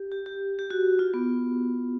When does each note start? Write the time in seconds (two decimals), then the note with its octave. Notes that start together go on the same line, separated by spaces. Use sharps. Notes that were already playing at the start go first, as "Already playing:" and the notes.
Already playing: G4
0.12 G4
0.26 G4
0.59 G4
0.70 F#4
0.99 F4
1.14 B3